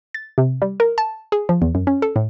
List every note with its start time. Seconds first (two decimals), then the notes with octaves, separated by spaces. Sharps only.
0.14 A6
0.38 C3
0.62 G3
0.80 A#4
0.98 A5
1.32 G#4
1.49 F3
1.62 E2
1.75 F#2
1.87 C#4
2.02 A4
2.16 A2